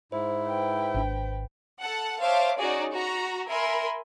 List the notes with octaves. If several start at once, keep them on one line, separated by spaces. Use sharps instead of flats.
G#2 E4 C5
B4 G5
G#1 D4
A4 F#5 A5
C5 C#5 E5 F5 A5 D6
C#4 D#4 F#4 G#4 C#5 D5
F#4 A#5
A#4 E5 G#5 B5 C6